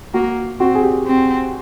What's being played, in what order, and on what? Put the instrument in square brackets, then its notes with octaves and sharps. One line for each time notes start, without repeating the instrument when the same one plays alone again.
[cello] A#3 [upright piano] F#4
[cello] C4 [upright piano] F#4
[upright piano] G#4
G4
[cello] C4